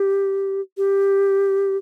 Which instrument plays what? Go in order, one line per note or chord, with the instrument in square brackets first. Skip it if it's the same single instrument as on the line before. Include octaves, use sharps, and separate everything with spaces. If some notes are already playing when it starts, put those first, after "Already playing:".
Already playing: [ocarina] G4
G4